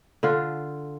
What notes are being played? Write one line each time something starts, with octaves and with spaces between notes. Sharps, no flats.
D3 F4